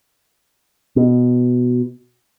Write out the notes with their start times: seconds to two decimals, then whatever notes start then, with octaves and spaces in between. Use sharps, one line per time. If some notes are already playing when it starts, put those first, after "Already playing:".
0.96 B2